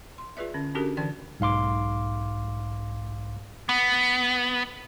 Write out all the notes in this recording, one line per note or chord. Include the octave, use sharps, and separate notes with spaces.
C6
F4 G#4 B4 D5 E5
D3 C#4
C#4 D4 F#4 G4 A4 A#4
D3 E3 D5 G5 A5
B1 G#2 F5 C6 D6
B3